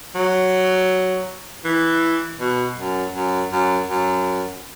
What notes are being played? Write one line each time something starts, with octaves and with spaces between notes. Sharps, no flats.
F#3
E3
B2
F#2
F#2
F#2
F#2